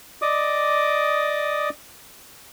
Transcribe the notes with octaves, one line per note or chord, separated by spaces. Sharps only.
D5 D#5 D6 D#6